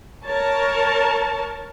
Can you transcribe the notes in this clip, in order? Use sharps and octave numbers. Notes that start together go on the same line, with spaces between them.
A#4 C#5 A5